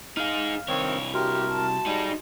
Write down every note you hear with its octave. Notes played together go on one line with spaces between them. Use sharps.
D#4 G#4 F5 F6
C2 D#3 C4 C#5
F#4 G4 A#4 E5 C6
A5
G3 D#4 G#4